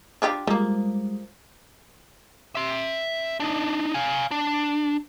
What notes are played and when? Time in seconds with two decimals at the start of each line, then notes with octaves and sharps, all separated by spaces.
0.22 D4 F4 G4
0.47 F3 G3 G#3 A#3
2.55 E5 C6
3.40 D4 D#4
3.94 F5 G#5
4.31 D4